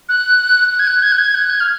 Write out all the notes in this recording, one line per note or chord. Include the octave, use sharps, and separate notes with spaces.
F#6
F#6
G#6
F#6
G#6
F#6
G#6
F#6
G#6
F6